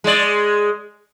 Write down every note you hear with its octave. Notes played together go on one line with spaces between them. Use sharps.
G#3 D5